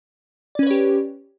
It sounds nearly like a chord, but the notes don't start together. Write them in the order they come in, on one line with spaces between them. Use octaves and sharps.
D5 C#4 B4 C#5 G4